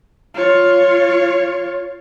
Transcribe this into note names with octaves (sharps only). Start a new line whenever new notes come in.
F4 C#5